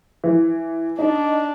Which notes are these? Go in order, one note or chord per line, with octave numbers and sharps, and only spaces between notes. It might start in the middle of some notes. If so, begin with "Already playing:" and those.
E3
D4 D#4